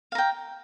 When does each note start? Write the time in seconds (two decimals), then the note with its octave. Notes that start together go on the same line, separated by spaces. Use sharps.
0.12 F5
0.15 A#5
0.18 G5